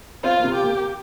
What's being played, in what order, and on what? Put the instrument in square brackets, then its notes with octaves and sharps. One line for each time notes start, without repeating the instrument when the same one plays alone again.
[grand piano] C4 C5 [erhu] F4
[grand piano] A#3
C3 C4
[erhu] G4
[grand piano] A#3